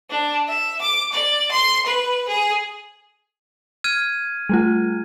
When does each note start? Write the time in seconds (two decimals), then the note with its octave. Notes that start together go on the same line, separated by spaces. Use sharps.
0.10 D4
0.48 E5
0.81 D6
1.12 D5
1.51 C6
1.86 B4
2.28 G#4
3.84 F6 G#6 D#7
4.49 G3 A3 F4